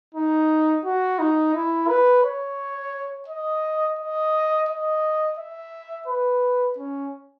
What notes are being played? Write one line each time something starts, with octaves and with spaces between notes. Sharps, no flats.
D#4
F#4
D#4
E4
B4
C#5
D#5
D#5
D#5
E5
B4
C#4